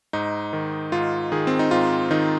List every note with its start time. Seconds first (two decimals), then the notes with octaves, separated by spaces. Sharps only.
0.13 G#2 D#4
0.53 D#3
0.92 G#2 F4
1.32 D#3 G#4
1.47 C4
1.59 D#4
1.71 G#2 F4
2.11 D#3 D#4